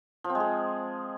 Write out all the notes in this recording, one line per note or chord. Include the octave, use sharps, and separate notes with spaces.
F3
C4
G#3
G#4